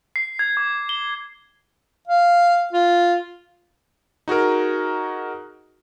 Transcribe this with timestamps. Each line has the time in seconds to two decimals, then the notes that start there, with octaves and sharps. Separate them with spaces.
0.16 C7
0.39 G#6
0.57 D6
0.89 G7
2.08 F5
2.73 F4
4.28 D#4 F#4 G#4 A#4